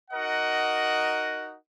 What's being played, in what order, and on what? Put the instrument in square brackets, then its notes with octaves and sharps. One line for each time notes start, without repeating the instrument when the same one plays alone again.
[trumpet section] D#4 F#4 A#4 D#5 F#5